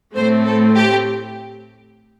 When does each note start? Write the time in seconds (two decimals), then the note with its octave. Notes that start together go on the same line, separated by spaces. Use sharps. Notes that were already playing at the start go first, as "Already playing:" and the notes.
0.15 A2 A3 C4 C5
0.45 A4
0.75 G4